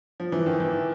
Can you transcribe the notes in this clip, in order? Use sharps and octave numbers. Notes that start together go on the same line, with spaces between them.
F3
E3
D#3
E3